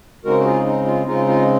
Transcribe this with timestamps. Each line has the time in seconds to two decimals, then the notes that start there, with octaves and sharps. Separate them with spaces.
0.25 C#3 G#3 C4 D#4 F#4 A#4
0.38 F#4
0.45 F4 G#4
0.66 D#4
0.86 F4
1.07 C#3 G#3 C4 D#4 F4
1.28 F4